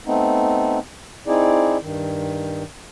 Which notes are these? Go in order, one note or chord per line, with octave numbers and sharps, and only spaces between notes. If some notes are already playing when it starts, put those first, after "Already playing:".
A3 B3 C4 D#4
C4 D#4 E4 G#4 D5
G2 D#3